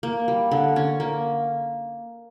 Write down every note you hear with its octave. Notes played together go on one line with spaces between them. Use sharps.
A#3
G3
D3
C#4
A#3